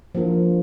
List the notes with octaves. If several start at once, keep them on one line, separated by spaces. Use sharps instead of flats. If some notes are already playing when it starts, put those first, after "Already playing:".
F3 A#3 D4 F4 A#4